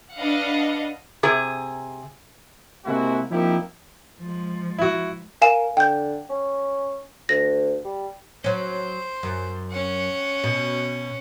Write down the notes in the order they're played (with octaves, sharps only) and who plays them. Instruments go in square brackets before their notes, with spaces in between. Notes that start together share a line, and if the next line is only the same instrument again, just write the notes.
[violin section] D4 B4 D#5 F5 F#5
[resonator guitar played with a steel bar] C3 G#4
[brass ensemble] C3 G#3 A#3 C4 E4 F#4
F3 A#3 C4 D#4 E4 G4
[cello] F3 G#3
[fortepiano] E4 F#4
[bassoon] A#4 [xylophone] F5 G#5 E7
[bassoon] D3 [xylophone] G5 G6
[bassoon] C#4
[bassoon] D2 [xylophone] A#6
[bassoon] G3
[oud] F#3 C#4 [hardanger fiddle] C5
[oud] F#2
[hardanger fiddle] C#4 F#5
[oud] B2